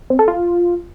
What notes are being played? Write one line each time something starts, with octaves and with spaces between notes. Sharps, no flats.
C4
A4
F4